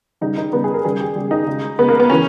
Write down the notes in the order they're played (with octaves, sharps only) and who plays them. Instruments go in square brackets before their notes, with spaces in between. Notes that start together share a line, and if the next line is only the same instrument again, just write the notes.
[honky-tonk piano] C#3 G3 D#4
D#4
C#3 G3 B3
G#4
A#4
C#3 G3 G#4
G4
C#3 G3
D#4
C#3 G#3
C#3 G#3 B3
A#3
B3
C#3 E3 C#4